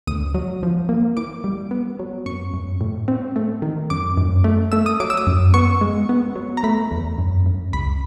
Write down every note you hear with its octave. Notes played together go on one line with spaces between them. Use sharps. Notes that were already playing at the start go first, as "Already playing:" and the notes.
D2 D#6
F#3
F3
A#3
E3 D6
G3
B3
F#3
F#2 C#6
F#2
A2
C4
A3
D#3
F#2 D6
F#2
A3
A3 E6
D#6
F#3 D6
E6
D#6
F#2
B3 C#6
G#3
B3
F#3
A#5
A3 B5
E2
F#2
F#2
C#2 B5